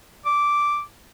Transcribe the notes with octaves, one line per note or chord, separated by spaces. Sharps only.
D6